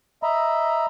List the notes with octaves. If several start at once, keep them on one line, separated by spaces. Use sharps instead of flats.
D#5 E5 A#5 B5